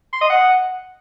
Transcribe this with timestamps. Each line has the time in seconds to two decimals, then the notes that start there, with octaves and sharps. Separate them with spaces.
0.13 C6
0.21 D#5
0.29 F#5